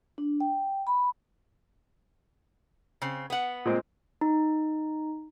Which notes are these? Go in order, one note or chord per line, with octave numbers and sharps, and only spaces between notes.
D4
G5
B5
C#3 C4
B3 F#5
A#2 G#3 C4
D#4